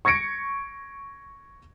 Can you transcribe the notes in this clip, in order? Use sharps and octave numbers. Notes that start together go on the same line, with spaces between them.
C#6 G#6 A#6 C#7 D7